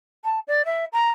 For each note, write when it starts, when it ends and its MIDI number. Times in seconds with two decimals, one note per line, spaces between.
0.24 0.39 81
0.47 0.65 74
0.65 0.85 76
0.92 1.09 82